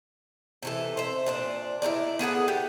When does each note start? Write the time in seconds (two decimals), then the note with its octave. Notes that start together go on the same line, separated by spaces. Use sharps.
0.62 C3 E3 A4
0.97 C5 E5
1.26 A#2 D4 C5
1.82 E4 G4 A#4 D5
2.19 B3 G#4 A4 F#5
2.48 G4